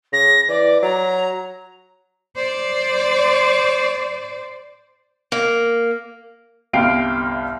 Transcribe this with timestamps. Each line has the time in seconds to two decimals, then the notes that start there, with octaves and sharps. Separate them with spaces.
0.13 C#3 A#6
0.49 E3 D5
0.83 F#3 A#5
2.36 C5 D5
5.32 A#3
6.73 G1 C2 F5 G5 C7 D7